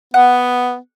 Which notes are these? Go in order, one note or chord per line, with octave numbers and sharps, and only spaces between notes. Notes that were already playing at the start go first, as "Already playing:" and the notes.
B3 F#5